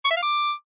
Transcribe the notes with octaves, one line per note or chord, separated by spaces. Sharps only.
C#6
E5
F5
D6